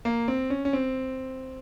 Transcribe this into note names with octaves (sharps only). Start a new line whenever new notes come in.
A#3
C4
C#4
C#4
C4